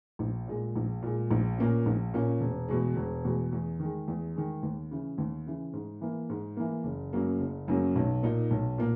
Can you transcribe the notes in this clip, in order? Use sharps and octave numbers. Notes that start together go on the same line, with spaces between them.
A#1
A#2 G#3
A#1
A#2 G#3
A#1
A#2 A#3 C#4
A#1
A#2 A#3 C#4
E1
E2 B2 G#3
E1
E2 B2 G#3
E2
D#3 G#3
E2
D#3 G#3
D#2
C#3 E3
D#2
C#3 E3
G#2
E3 A#3
G#2
E3 A#3
F#1
F#2 C#3 F#3 A#3
F#1
F#2 C#3 F#3 A#3
B1
A#2 A#3 D#4
B1
A#2 A#3